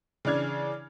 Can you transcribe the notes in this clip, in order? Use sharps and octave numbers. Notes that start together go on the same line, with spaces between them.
C#3 E3 D4 F6 G#6